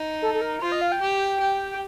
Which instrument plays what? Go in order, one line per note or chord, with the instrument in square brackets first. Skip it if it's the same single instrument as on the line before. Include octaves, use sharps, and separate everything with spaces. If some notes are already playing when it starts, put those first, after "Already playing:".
Already playing: [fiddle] D#4
[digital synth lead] A4
A4
A#4
[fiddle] F4 [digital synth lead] C5
[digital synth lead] D#5
F5
G5
[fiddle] G4
G4
[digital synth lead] G5